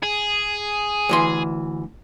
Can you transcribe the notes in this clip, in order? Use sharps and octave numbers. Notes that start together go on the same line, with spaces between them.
G#4
D2 E3 C6